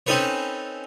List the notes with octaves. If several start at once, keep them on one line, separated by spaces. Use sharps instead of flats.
C4 C#4 D#4 A4 B4 C#5